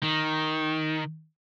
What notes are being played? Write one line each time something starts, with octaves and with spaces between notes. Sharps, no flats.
D#3